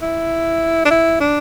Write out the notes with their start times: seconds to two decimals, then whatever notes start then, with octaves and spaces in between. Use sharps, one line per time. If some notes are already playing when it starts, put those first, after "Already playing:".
0.02 E4
0.85 D4
0.90 E4
1.20 D4